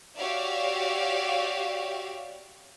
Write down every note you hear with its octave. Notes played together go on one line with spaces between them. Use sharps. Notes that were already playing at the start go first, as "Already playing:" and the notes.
F#4 G4 C#5 D5 E5 F5